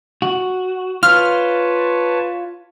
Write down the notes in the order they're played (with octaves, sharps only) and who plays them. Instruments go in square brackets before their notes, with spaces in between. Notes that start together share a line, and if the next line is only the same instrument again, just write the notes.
[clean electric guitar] F#4
[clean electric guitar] F4 [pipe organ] B4 C#5 A5 [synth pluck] F6